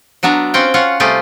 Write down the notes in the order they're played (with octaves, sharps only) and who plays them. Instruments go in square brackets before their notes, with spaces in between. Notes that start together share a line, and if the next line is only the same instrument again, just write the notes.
[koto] F#3 B3 D4 E5 A#5
C4 C#4 F4 F#5 G5
C#4 F4 C#5 F#5
C3 G3 A3 F4 G4 G#4